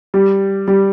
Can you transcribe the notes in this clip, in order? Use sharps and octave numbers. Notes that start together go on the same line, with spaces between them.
G3
G3